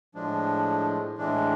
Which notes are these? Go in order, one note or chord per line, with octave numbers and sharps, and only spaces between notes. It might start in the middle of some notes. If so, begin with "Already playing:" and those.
A2 F3 G#3 D4
A2 E3 G#3 D4